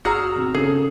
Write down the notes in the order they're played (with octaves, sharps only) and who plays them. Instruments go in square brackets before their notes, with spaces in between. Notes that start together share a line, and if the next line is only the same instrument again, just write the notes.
[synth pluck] G1 E6 F6 [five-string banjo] F#4 G#4 A#5
[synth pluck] B2 D#3 C4
[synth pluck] C#3 C#4 A4 [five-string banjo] G#4